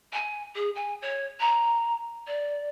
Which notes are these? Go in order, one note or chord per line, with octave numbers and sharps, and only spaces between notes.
G#5
G#4
G#5
C#5
A#5
D5